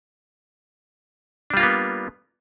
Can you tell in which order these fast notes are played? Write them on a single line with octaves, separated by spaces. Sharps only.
D4 G3 F4 A#3 B3